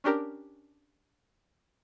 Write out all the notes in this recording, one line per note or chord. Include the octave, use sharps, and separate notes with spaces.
C#4 D4 G4 A#4